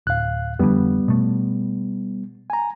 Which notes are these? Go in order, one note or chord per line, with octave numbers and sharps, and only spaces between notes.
D1 F5 F#6
F2 D3 G3 B3
B2 A3
G#5 A#5